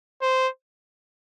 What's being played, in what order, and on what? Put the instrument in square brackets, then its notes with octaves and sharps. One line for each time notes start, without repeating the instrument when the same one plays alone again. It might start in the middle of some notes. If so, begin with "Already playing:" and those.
[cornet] C5